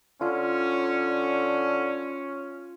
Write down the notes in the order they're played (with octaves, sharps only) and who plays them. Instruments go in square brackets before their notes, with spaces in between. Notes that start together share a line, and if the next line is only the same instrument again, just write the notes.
[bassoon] D3 [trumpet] C#4 [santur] F4